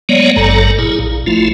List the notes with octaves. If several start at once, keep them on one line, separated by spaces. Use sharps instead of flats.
F#3 G#3 A#3 B3 C#5 D5
G#1 G2 F#3 A4 A#5
A#2 E4 G#4
A#1
F3 A3 E4 F4